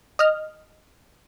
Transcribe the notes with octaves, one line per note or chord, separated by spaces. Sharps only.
D#5 F6